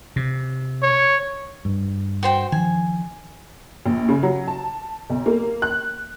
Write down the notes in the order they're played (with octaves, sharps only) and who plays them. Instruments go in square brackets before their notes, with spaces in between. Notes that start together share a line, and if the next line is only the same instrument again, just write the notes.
[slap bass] C3
[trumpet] C#5
[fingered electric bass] G2
[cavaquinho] F#4 C5 G5
[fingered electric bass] D#3 F3 [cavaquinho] G#5
[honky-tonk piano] A#1
C#3
F#3
A5
B1
A#3
F#6